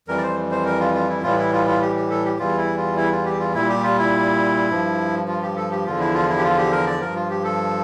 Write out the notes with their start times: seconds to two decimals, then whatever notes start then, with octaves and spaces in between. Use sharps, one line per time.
0.08 F2 E3 G3 A#4
0.18 D5
0.23 C5
0.51 C5
0.66 A#4
0.80 F4
0.95 F4
1.09 E4
1.23 A2 E3 G3 F4
1.38 E4
1.53 F4
1.67 F4
1.82 G4
1.96 G4
2.10 A4
2.25 G4
2.39 E2 E3 G3 F4
2.58 E4
2.78 F4
2.97 E4
3.12 F4
3.25 G4
3.40 F4
3.54 A#2 G3 E4
3.69 G4
3.84 F4
3.98 E4
4.70 G2 F3
5.28 F4
5.42 G4
5.56 A4
5.71 G4
5.86 E2 D3 F3 F4
6.00 E4
6.14 F4
6.29 E4
6.37 G4
6.43 F4
6.58 G4
6.72 A#4
6.87 D5
7.01 G2 F3 A#4
7.16 F4
7.30 G4
7.45 A4